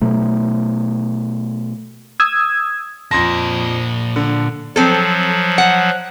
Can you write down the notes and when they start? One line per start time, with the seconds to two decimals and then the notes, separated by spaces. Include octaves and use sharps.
0.01 B2 F#3 A3
2.20 D#6 E6 G#6
3.11 F2 A#2 A5 C6 A#6
4.16 D3
4.76 F3 F#3 C4 A4
5.58 F#5